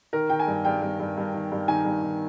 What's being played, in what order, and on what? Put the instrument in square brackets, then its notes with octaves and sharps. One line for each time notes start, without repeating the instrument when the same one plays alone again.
[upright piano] D#3 A#4
D#3 G5
G#5
G2
G2 G5
G2
G2
G2
D#3
G2
D#3 G#5
G2
D#3